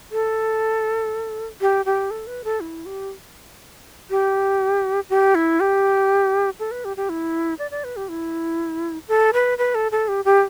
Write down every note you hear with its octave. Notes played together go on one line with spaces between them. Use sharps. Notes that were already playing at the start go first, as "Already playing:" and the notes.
A4
G4
G4
A4
B4
A4
E4
G4
G4
G4
E4
G4
A4
B4
G4
G4
E4
D5
D5
B4
G4
E4
A4
B4
B4
A4
A4
G4
G4